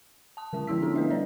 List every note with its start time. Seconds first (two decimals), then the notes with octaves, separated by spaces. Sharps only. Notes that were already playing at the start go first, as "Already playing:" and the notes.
0.37 A5 D#6
0.53 D3 G#3 C#4
0.67 F3 B3 E4 E6 B6
0.82 D4 E4 A4
0.96 A3 B4 D#5 E5
1.10 G3 D4 C#5 D5